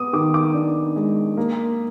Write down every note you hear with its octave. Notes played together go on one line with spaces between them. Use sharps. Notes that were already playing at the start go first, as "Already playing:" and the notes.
Already playing: B3 D6 D#6
D#3 D6
D6
D4
G#3
A#3